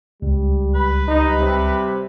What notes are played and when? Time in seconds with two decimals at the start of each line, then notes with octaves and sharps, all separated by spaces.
0.22 C#2 G3
0.75 B4
1.08 G3 D#4
1.40 C3